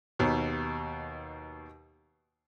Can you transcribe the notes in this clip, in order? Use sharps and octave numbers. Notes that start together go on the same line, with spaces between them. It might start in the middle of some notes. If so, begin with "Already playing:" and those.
D#2 B2